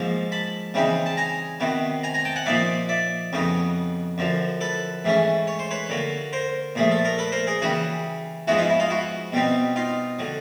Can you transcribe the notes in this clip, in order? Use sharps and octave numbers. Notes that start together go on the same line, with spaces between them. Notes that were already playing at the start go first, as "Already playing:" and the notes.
Already playing: G#2 F3 A#3
A5 B5
C#3 E3 G3 C4 D#4
A5
G#5 A#5
C3 D#3 F#3 B3
G#5 A#5
G#5 A#5
G5 A5
F#5 G#5
A#2 F3 A#3 D#4 D5 E5
D5 E5
F2 C#3 F#3 B3 D#4
F#2 D3 F3
A4 B4
G#2 E3 A3 C#4
C#5
C5
B4 C#5
D3 F#3 A#3
A#4 C5
A#2 F3 A3 G#4
A4
A#4
A4 B4
A#4 C5
G#4 A#4
C#3 E3 G3 F#4 G#4
G#2 F3 G#3 B3 D#4 E4 F#4
D#4 F4
E4
D#4 F4
E4 F#4
B2 G3 C4 D#4
D#4 F4
D3 F#3